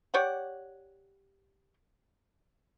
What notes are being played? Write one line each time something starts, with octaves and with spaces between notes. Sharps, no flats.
G4 C#5 D5 F#5